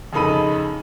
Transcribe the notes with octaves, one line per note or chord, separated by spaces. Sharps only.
F2 C#3 D#4 A4 B5 D#7